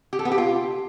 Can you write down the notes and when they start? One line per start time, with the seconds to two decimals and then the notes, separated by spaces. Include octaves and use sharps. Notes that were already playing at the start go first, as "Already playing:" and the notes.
0.13 G4
0.19 A4
0.25 B3
0.32 G4
0.38 F4